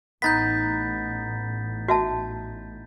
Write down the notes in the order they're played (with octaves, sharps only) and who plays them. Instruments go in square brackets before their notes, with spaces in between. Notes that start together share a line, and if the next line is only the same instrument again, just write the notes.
[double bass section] A1 [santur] B3 D#4 [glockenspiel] G6 A6 B6
[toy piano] F#4 E5 A5